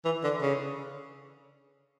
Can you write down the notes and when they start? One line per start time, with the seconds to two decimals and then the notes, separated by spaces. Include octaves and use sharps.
0.05 E3
0.24 D3
0.42 C#3